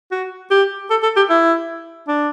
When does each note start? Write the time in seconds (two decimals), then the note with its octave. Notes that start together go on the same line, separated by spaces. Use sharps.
0.12 F#4
0.51 G4
0.90 A4
1.03 A4
1.16 G4
1.29 E4
2.08 D4